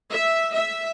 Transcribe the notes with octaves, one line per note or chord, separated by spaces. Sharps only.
E5
E5